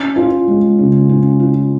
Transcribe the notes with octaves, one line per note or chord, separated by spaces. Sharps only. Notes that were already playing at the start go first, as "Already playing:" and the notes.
Already playing: C#4
F4
G#3
C#3
C#4
F4